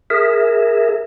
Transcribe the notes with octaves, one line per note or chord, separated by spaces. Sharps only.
G#4 A#4 E5